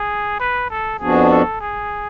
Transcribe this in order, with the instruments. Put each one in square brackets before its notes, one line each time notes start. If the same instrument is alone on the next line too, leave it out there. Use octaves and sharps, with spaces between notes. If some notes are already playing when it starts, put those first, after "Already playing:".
Already playing: [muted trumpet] G#4
B4
A4
[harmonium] F2 F3 B3 D4 F#4 [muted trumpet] G#4
[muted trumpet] A4
G#4